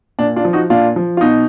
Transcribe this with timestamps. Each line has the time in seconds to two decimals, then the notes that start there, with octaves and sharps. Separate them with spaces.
0.19 A#2 D4
0.36 D4 F4
0.45 F3
0.53 D#4 F#4
0.70 A#2 D4 F4
0.96 F3
1.17 F4
1.21 B2 D#4